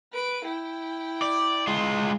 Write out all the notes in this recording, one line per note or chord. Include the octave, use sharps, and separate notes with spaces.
B4 D7
E4 G5
D5
G#3 F4